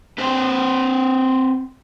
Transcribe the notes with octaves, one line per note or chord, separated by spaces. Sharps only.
C4 B4 C5 G5